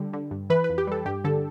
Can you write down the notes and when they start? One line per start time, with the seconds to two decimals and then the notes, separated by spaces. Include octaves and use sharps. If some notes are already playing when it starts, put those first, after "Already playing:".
Already playing: D3 G3
0.13 D3
0.31 G2
0.50 E3 B4
0.64 B4
0.69 F2
0.78 G4
0.87 G3 A4
1.05 G2 G4
1.24 D3 A4